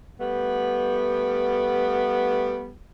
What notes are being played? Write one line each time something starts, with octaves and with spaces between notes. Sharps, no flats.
G3 A3 B3